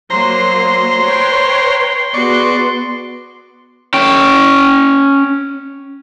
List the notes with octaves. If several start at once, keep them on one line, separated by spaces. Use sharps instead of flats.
F#3 A#3 C5 A#5 C6
B4 C#5 G5
B3 F#4 G#4 D5 C#6
C#4 G5